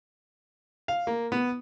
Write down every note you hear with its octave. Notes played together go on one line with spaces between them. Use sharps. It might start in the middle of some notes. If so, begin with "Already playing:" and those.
F5
A#3
B3